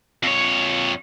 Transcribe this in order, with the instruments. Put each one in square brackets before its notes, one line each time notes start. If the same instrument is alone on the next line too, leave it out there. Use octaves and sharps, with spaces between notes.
[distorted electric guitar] F2 C#5